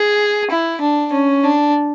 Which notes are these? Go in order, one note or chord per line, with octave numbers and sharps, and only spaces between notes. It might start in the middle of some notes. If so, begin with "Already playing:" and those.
Already playing: G#4
E4
D4
C#4
D4